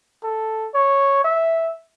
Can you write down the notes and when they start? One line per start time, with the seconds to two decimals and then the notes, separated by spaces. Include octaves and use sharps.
0.23 A4
0.74 C#5
1.24 E5